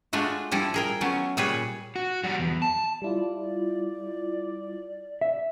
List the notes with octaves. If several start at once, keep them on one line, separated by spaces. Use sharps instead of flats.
G#3 A3 D4 F4 F#4
F3 G3 E4 A4
G#4 A#4 G5
F#3 A3 B3 C#4
A#2 G3 G#4 B4 C#5
F#4
G3 F#4
E2
A5
G3 E4 F4 D5
E5